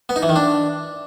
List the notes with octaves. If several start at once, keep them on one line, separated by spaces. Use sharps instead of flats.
B3
D#4
E3
D#3
D4